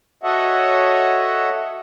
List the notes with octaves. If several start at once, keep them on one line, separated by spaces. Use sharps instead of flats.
F#4 A4 C#5 D#5 E5 F#5